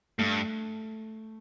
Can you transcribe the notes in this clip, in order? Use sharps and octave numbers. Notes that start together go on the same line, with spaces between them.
G2 A3